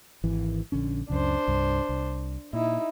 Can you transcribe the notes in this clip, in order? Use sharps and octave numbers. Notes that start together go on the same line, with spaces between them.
G#1 E3
A#1 D3 C#4
C#2 F#2 C#3 D4 C5
C2 G2
C2
A#2 D#4 E4